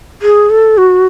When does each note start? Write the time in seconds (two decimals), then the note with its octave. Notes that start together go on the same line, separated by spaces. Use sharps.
0.22 G#4
0.50 A4
0.78 F#4